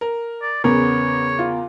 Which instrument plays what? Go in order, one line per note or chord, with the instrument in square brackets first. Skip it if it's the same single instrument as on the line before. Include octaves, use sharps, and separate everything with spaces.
[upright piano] A#4
[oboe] D5
[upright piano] E2 C#3 A#4 [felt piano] B3 [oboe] C#5
[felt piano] F4